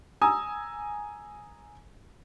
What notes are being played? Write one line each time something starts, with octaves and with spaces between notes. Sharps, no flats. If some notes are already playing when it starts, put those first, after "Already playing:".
G#5 A#5 D#6 E6